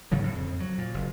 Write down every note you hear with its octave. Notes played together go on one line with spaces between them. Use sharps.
G#2 C#3 F3 F#3
A2
F2
F#3
A#2
F#1